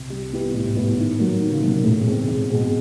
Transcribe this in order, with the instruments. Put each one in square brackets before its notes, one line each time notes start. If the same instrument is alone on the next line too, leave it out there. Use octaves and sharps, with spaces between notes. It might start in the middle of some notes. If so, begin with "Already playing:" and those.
Already playing: [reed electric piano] C2 C3
[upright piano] G3
B3 E4 G4 B4
[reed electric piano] A2 [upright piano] G3
[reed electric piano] G#2
[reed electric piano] A2 [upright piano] B3 E4 G4 B4
[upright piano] D#3
F#3 A#3
D#3
[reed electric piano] C#3
[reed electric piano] C3 [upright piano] F#3 A#3
[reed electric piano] B2
A#2
[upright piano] E2 [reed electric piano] A2
[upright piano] B2 G#3 C4
E2
B2 G#3 C4